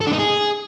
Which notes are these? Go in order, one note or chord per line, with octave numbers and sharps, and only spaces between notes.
A4
D4
D#4
G#4